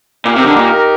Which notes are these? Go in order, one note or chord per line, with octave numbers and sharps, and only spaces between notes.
A#2 D#4 G4 A#4
C3
D3
A#2